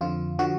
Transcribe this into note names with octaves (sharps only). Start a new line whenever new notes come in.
F2 D3 F3 F4
D3 F3 F#4